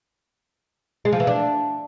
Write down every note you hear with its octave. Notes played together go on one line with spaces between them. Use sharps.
G#3
F3
E3
D4